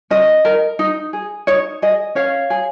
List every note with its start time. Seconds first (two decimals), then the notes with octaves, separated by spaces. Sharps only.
0.10 C#4 D#5
0.45 A#4
0.79 D#4
1.13 G#4
1.47 D#4 C#5
1.82 G#4 D#5
2.15 C#4 C#5 F5
2.50 G#4